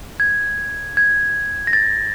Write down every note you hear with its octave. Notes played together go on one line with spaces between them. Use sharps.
G#6
G#6
A#6
A6